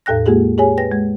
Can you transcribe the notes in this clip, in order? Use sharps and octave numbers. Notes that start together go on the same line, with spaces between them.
E2 A2 A4 G5 F#6 A#6
G#3 A#3 F4 G4 G#4
G4 G#4 C#5 G#5
B4 G5 A#6
G#3